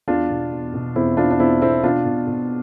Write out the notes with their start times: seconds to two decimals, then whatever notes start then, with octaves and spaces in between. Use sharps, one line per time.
0.08 E2 D4 F4
0.29 B2
0.52 E2
0.74 B2
0.96 E2 C4 E4
1.17 E2 D4 F4
1.31 D4
1.40 E2 C4 E4
1.62 B2 C4 E4
1.83 B2 D4 F4
2.06 B2
2.27 B2